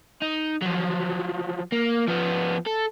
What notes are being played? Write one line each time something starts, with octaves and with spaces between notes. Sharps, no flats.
D#4
F3 F#3
A#3
F3 B3
A4